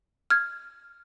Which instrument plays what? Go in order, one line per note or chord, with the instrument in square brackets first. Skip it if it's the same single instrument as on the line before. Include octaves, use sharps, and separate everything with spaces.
[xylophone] F6 G#6